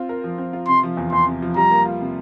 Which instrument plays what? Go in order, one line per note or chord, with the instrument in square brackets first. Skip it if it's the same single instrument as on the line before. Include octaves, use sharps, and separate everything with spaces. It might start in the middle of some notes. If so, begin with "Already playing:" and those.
Already playing: [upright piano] C4 F4
A#4
F3
C4
F4
[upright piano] C3 [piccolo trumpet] C6
[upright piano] F3
E2
[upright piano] E2 [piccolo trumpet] C6
[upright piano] C3
F3
[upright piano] G3 [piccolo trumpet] A#5
[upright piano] A#3
F4
C3